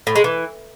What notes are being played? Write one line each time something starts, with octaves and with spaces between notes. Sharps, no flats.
A2
G#3
E3